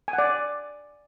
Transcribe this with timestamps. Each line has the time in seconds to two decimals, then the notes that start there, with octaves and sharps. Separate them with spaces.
0.08 G#5
0.13 F#5
0.18 D5